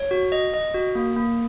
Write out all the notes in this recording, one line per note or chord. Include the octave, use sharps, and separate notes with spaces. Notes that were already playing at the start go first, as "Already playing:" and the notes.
Already playing: C#5
F#4
D#5
D#5
F#4
A#3
A#3